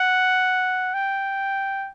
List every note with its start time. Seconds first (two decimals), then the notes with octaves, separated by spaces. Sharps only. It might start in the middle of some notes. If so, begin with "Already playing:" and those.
Already playing: F#5
0.94 G5